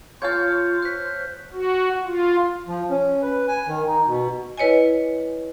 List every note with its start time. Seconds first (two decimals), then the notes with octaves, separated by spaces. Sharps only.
0.22 F4 C#5 F5 A5 F6 G6
0.82 C5 F#6 B6
1.53 F#4
2.06 F4
2.67 F3
2.90 C#4
3.22 B4
3.48 G#5
3.67 D#3
3.87 D#4
4.07 B2
4.57 E4 B4 C#5 D#5 G#5